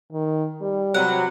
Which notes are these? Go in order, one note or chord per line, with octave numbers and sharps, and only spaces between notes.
D#3
G3
C3 F#3 B4 F#5